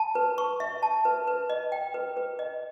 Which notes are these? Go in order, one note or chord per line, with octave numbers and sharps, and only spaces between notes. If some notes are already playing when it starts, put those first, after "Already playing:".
Already playing: A5
B4
C#6
E5
A5
B4
B4
D#5
G5
B4
B4
D#5